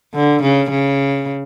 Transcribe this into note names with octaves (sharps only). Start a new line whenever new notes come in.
D3
C#3
C#3